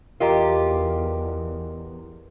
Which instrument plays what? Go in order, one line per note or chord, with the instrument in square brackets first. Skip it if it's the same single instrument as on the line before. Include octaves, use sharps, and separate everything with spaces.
[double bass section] E2 [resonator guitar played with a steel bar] F4 G4 [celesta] A#4 D#5 A#5